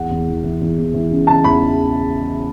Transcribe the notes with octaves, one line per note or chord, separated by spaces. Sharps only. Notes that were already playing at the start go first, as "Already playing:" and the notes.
Already playing: E2 F#5
E2
E3
E3
E2
E2
E3
C#3
C#3 A5
E2 B5